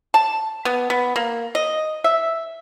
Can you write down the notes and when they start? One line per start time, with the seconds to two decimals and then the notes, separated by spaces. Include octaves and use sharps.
0.14 A5
0.65 B3
0.90 B3
1.16 A#3
1.55 D#5
2.04 E5